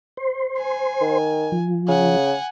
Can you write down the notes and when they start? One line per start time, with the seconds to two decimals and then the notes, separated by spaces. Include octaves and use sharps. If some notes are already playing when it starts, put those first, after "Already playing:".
0.17 C5
0.59 G#5
1.01 D#3
1.52 F3
1.88 C#3 F#5 G#5